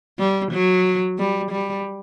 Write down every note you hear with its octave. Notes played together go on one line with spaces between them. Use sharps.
G3
F#3
G3
G3